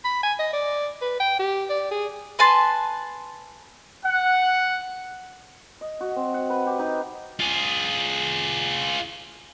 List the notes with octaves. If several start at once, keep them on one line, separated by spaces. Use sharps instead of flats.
B5
G#5
D#5
D5
B4
G5
G4
D5
G#4
B4 G#5 A5 C6
F#5
D#5
F#4
C4
F#5
B4
G4
D#4
F4 G#4